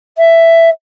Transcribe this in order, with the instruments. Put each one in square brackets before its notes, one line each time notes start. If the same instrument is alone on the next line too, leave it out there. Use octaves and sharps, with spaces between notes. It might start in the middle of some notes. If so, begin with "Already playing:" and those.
[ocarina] E5